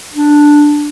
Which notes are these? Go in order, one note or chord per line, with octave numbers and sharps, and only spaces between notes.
D4